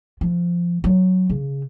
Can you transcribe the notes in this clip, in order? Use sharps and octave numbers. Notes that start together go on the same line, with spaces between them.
F3
F#3
C#3